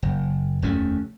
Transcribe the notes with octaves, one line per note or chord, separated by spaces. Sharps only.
F#1
F1 D#2 A3 C#4